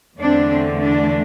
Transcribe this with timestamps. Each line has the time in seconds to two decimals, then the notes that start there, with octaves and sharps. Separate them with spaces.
0.18 E2 D3 A3 C4 D4
0.49 C4
0.80 D4